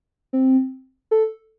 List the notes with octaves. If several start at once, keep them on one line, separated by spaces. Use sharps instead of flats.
C4
A4